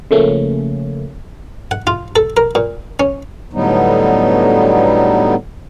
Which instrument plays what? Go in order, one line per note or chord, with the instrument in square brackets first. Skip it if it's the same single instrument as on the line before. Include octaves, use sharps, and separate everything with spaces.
[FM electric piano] C#3 F3 A3 A#3 C#4
[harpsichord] F#5
F4
A4
A#4
A#2
C#4
[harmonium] A2 D3 F#3 G3 B3 D#4